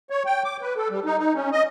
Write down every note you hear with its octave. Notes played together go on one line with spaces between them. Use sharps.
C#5
G5
D6
B4
A4
G3
D#4
D#4
C#4
D#5